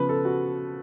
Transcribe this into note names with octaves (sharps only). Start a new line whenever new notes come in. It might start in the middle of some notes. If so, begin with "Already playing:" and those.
Already playing: C#3 F3 B3 B4
A4
F#4